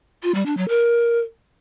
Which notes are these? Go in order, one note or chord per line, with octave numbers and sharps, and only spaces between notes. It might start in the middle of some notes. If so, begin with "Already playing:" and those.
F4
G3
D4
F#3
A#4